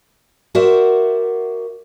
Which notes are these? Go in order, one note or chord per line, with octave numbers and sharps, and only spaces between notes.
F#4 A#4 C5 D5 E5 F#5